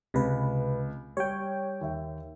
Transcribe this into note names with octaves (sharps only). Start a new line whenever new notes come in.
C#2 C3 B4
G3 C#5 G5
D#2 E5